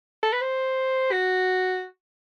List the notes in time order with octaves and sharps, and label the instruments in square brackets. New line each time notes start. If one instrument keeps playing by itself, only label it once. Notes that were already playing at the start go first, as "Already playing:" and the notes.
[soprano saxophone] A4
B4
C5
F#4